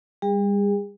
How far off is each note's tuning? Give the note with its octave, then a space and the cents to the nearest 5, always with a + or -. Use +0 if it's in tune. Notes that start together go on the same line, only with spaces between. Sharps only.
G3 +35 G#4 -35 G5 +40